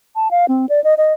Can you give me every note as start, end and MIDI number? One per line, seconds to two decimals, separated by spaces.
0.16 0.31 81
0.31 0.46 77
0.48 0.66 60
0.69 0.83 74
0.84 0.94 75
0.98 1.13 75